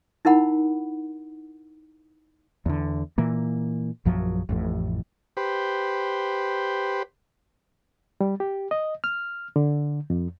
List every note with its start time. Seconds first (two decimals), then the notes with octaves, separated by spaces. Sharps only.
0.25 D#4 E4 A#4 F#5 B5
2.66 E2 D3
3.18 A#2 E3 A#3
4.05 A#1 F#2 F3 F#3
4.49 A1 F2 A2
5.37 G4 B4 C5
8.21 G3
8.40 G4
8.71 D#5
9.04 F6
9.56 D3
10.10 F2